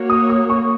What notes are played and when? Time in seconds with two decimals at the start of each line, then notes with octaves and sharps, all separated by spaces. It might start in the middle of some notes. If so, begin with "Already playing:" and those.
Already playing: A#3 F#4 C#5
0.10 D#6
0.30 D#6
0.50 C#6